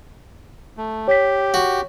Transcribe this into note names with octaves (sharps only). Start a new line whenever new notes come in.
A3
G4 C#5 B6
F#4